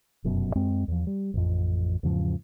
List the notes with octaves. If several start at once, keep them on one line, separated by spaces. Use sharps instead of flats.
F1 F#2 B2
F#2 G#3 C4
E2 F3
G3
A1 F2
E2 G#2 C#3 F3